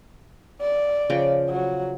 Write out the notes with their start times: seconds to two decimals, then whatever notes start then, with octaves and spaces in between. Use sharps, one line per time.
0.61 D5
1.10 C#3 F3 G5
1.50 F#3